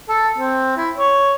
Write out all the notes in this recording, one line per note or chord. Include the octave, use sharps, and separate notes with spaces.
A4
C4
E4
C#5